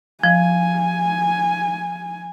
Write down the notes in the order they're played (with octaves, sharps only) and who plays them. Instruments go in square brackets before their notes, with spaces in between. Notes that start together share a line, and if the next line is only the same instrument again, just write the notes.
[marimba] F3 [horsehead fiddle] G#5